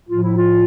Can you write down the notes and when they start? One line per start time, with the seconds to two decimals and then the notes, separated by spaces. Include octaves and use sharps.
0.09 A2 F3 F4
0.22 E4
0.35 F4